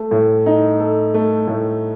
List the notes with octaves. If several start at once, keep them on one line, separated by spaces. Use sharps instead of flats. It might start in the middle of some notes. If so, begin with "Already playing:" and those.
Already playing: A3
A2
D#4
A4
A3
A2